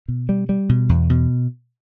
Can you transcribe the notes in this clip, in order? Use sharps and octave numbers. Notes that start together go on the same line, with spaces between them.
B2
G3
G3
B2
E2
B2